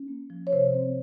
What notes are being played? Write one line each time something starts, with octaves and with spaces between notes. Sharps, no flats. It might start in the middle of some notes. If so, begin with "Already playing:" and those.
Already playing: C#4
A#3
F3
C#5
C3 C5
C4